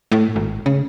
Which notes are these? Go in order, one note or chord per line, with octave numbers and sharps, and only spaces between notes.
A2
G#1
C#3